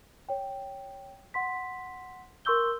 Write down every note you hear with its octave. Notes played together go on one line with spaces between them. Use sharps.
C#5 G5
F#5 C6 B6
A#4 C6 C#6 E6 G6 G7